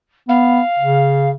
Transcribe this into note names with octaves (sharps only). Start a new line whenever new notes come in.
B3 F5
C#3